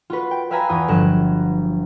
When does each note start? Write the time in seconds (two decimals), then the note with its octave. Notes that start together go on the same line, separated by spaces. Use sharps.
0.10 F4 F#4 B4
0.31 G5
0.51 B4 E5 F5 G#5 A#5 B5
0.69 E2 F4 G#5 D#6
0.88 G1 F3 F#3 F#6 E7